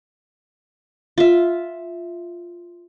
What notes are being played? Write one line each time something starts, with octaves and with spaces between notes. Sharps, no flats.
F4 E5